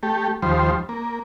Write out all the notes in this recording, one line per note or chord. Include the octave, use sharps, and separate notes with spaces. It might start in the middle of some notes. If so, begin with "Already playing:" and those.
A3 G4
D#2 F3 G3 C5
A#3